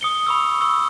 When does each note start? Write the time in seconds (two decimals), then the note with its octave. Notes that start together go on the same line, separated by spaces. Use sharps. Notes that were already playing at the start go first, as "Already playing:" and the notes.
0.01 D#6 C#7 G7
0.26 B5 C#6 E6
0.61 C#6 E6